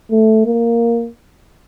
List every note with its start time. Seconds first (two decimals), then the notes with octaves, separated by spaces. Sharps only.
0.11 A3
0.46 A#3